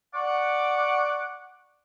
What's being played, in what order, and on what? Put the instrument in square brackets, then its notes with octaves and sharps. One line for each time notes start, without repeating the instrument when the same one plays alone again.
[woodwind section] D5 F#5 C#6 D6